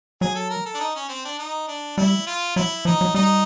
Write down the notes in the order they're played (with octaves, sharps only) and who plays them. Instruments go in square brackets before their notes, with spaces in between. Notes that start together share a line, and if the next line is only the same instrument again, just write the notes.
[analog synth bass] F#3 [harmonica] G#4
[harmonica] A4
A#4
A4
D4
D#4
C#4
C4
D4
D#4
D4
[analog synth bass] G3 [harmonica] E4
[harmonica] F4
[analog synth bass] F#3 [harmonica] E4
[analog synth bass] F3 [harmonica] D#4
[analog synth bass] F#3
[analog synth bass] G3 [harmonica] D#4